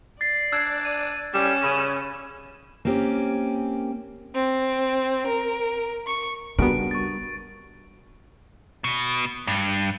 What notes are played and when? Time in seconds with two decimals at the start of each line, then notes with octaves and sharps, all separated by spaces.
0.21 D5 A6 C7
0.52 D4 E6 F#6 G#6
0.84 D#7
1.34 G3 C#4 C#5 E7
1.64 C#3 B5 D#7
2.85 A#3 C4 C#4 G4
4.35 C4
5.27 A#4
6.06 C#6
6.59 C#3 G3 B3 D4 F#4 A#4 D7
6.91 C#6 A6
8.84 B2
9.47 G2